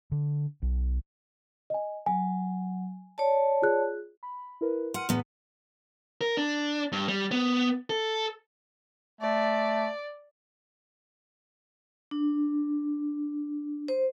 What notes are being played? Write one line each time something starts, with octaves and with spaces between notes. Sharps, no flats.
D3
B1
D#5 G#5
F#3 G#5
C#5 D5 A5
F4 G#4 F#6
B5
E4 A#4 B4
F#5 C6 F6 D#7
E2 A2 E3 B3
A#4
D4
G2
G3
B3
A4
A3 D5
D4
C5